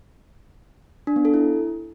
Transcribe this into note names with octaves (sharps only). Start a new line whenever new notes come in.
D4
B3
A4
E4